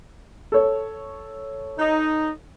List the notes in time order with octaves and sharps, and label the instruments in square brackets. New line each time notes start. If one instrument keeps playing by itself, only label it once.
[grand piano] A4 C#5
[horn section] D#4